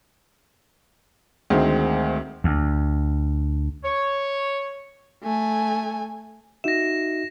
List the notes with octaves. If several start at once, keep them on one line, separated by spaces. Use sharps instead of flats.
D2 D#3 G#3 C4
D2
C#5
A3 G#5
D#4 F#4 E5 A#6 E7